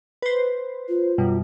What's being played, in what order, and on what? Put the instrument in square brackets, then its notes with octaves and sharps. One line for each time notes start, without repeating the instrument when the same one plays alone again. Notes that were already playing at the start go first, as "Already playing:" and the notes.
[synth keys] B4 C5
[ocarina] F4
[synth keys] F#2 B2 G3